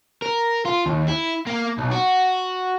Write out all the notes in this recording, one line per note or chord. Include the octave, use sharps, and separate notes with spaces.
A#4
F4
D#2
E4
A#3
B1
F#4